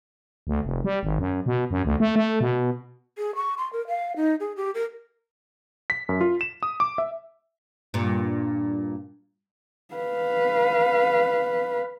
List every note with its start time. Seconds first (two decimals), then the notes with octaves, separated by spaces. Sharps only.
0.47 D2
0.64 F1
0.84 G3
1.03 G#1
1.19 F#2
1.46 B2
1.71 F#2
1.85 D2
2.00 A3
2.16 A3
2.41 B2
3.18 G#4
3.35 C#6
3.58 C6
3.73 A#4
3.88 F5
4.16 D#4
4.40 G#4
4.56 G4
4.74 A#4
5.90 B6
6.09 F#2
6.21 F4
6.41 E7
6.63 D#6
6.80 D6
6.98 E5
7.94 G2 A#2
9.95 B4 F5